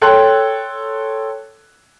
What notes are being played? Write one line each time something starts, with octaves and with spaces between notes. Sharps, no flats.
A4 C#5 G5 C6 F#6